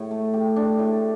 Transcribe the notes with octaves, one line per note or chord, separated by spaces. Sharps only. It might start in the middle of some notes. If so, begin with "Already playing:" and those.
Already playing: A2
A3
G4
D4
A2